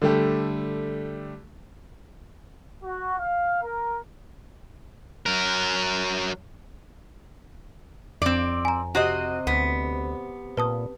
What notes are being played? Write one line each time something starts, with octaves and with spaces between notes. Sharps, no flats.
D3 G3 A3 G4
F#4
F5
A#4
F#3 A#4
F2 C4 D5
G#5 A#5
C3 C4 F#4 D#5
D2 B3
A#2 B4 A5 D#6